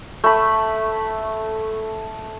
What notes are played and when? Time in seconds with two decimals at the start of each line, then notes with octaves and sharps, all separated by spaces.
0.24 A3 B5